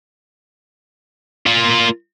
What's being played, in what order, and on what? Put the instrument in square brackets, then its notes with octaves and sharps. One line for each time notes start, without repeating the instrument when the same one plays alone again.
[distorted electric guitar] A#3 F4